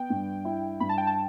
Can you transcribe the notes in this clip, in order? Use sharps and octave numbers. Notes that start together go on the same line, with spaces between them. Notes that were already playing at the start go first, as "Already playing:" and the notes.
Already playing: B3 G5
G2
E4
G2 B5
A5
G5
A5